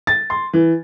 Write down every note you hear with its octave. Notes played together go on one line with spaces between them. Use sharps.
A6
C6
E3